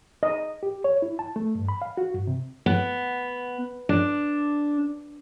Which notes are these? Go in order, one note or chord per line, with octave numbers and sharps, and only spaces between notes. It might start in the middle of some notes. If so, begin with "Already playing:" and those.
D#5
G4
C#5
E4
A5
A3
G2
B5
F5
F#4
G2
C3
B3
D4